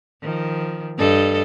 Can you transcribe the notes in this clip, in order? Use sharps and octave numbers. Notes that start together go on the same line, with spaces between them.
D#3 F3
G2 A4 D#5